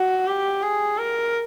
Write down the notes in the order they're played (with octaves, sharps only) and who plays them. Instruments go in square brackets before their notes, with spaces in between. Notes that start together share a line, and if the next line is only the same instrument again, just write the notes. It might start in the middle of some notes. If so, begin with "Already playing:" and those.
Already playing: [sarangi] F#4
G4
G#4
A#4